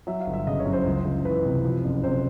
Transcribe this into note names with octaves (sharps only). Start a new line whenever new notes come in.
F#3 E5
F5
G1
E5
C#3 D#5
C#5
F#2
C5
C#2
C#2
E3 B4
C3
F3
F#1
C3 C5